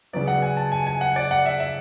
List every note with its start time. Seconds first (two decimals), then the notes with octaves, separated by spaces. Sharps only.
0.13 C#3 F#3 B3 D5
0.28 F#5
0.42 G#5
0.57 A5
0.72 G#5
0.87 G#5
1.01 F#5
1.16 D5
1.31 F#5
1.46 E5
1.60 E5